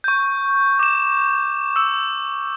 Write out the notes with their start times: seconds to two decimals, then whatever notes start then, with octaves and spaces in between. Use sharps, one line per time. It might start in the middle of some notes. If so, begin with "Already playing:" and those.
0.04 C#6 G6
0.79 D6 E7
1.76 E6 E7